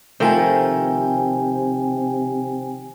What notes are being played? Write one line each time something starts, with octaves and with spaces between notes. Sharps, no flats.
C3 D#3 F3 A3 C5 G5 G#5